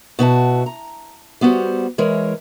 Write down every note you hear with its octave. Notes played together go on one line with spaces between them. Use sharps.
B2 E4 F#4 A5
A#5
G3 B3 F#4 C5
E3 G#3 A#4 C#5